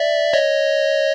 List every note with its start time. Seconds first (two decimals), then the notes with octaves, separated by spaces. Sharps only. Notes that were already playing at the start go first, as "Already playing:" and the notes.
Already playing: D5 E5
0.33 C#5 D#5